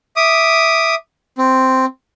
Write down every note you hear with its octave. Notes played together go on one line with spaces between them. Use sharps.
E5 D6 D#6
C4